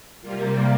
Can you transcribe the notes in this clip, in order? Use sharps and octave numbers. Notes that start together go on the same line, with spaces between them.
C3 G3 A#3 F4